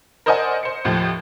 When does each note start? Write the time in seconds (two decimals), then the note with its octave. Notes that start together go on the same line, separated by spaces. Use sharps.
0.26 A#4 C5 D5 D#5 F#5 G#5
0.63 C5 C#7
0.85 D#2 A2 F3